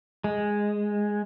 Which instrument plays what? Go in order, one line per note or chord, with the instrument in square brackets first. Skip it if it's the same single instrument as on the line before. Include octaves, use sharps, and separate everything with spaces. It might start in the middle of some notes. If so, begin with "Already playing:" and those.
[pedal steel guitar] G#3